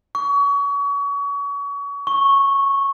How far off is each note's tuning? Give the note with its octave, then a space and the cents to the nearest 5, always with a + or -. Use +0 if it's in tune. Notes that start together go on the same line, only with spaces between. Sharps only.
C#6 +30
C#6 -10